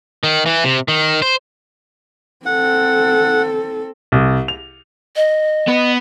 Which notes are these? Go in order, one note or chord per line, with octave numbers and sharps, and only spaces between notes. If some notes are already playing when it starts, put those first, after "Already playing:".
D#3
E3
C3
D#3
C5
C4 A4 F#5
C2
F7
D#5
B3 B4